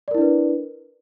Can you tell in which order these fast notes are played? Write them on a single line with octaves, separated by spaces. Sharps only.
D5 A#4 E4 D4 B4